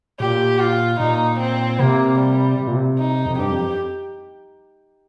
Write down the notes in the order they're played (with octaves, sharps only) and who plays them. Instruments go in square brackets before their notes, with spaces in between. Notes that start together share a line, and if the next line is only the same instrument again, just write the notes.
[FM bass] A#2 [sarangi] G4
[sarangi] F4
[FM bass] A#2 [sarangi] D#4
[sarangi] C4
[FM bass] C3 [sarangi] A#3
[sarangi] G3
[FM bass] C3
A#2
C3
[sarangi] D#4
[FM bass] F2
[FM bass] G2 [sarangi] G4
[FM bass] F2